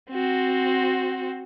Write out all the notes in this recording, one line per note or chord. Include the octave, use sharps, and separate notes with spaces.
C4 F#4